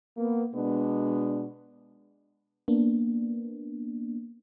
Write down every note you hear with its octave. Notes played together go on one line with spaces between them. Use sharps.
A#3 B3
B2 G#3 B3 D4
A#3 B3 D4